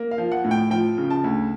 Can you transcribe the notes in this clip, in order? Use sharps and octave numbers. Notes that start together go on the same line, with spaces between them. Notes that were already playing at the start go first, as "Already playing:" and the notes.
Already playing: A#3
F5
F3
F#5
A2
G5
F3 G5
C#3
A5
D2